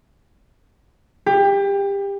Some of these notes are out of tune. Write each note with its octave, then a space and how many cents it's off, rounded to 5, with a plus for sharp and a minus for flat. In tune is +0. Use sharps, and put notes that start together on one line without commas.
G4 +25